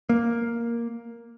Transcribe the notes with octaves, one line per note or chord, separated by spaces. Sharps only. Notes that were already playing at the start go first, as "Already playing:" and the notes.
A#3